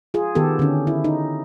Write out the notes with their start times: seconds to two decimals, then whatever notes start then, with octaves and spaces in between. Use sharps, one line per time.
0.14 F4 G#4
0.35 D#3 B3 G4 A4
0.59 D3 C#4
0.87 E4
1.04 D#4